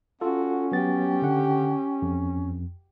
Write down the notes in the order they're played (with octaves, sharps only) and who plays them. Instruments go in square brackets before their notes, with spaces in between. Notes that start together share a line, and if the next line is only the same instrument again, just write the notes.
[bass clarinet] C#4 [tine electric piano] F4 A4 [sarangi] F#4
[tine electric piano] F#3 B3 A6 [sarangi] G4
[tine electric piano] D3 F#5
F2